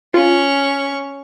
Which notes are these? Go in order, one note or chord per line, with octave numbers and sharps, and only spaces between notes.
C#4 F4 C#6